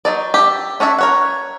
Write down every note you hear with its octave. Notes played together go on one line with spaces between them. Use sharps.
F#3 D#4 D5
G4 E5
C#4 D4 C#5 E5
A#4 C#5 F#5